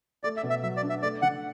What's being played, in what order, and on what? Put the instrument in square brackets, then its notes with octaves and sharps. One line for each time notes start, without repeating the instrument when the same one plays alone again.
[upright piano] A3 [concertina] D5
[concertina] E5
[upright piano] B2
[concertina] E5
[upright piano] F#3 [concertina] E5
[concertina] D5
[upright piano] D4
[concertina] E5
[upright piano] A3 [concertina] D5
[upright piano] D3 [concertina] F#5